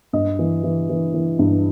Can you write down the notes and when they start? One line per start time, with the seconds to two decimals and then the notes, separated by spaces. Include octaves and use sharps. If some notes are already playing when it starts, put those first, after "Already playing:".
0.13 G2 D#5
0.39 E3
0.64 E3
0.89 E3
1.14 E3
1.39 G2